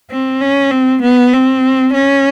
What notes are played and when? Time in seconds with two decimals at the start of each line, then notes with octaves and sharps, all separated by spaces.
0.11 C4
0.41 C#4
0.71 C4
1.02 B3
1.33 C4
1.93 C#4